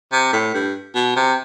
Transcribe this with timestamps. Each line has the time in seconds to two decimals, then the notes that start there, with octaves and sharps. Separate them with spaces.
0.13 C3
0.33 A2
0.54 G2
0.95 B2
1.16 C3